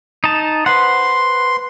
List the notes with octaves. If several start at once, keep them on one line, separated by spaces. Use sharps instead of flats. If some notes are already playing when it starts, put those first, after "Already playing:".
D#4 A5
B4 C5 F#5 C6